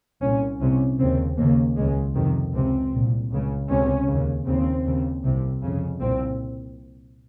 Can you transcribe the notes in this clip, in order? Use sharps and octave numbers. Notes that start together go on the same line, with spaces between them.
C2 A#2 C#4
C2 C3 C#4
D#2 C#3 C4
D#2 C#3 A#3
C#2 C#3 G#3
F2 C3 D#3
C#2 C3 C4
C2 A#2
C#2 C#3
C#2 C3 C#4
D#2 C#3
D#2 C#3 C4
D#2 C#3
C2 C3
F2 C#3
C2 A#2 C4